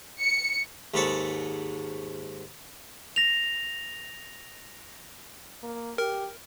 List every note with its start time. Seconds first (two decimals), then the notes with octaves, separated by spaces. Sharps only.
0.20 C#7
0.94 D#2 G#2 G#3 A4 C#5 A5
3.16 A#6 F7
5.63 A#3
5.98 G4 A#4